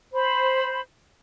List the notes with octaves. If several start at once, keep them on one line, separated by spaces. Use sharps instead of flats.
C5 B5